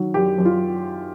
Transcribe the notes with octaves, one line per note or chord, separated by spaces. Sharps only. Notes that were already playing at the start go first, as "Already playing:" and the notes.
Already playing: D#3 F#3
F#2 G4
F#2
F4